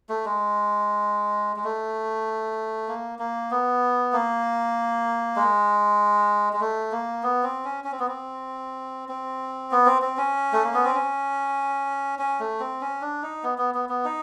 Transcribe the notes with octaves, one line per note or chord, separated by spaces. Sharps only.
A3
G#3
G#3
A3
A#3
A#3
B3
A#3
G#3
G#3
A3
A#3
B3
C4
C#4
C#4
C4
B3
C4
C4
B3
C4
C4
C#4
A3
A#3
B3
C4
C#4
C#4
A3
C4
C#4
D4
D#4
B3
B3
B3
B3
D#4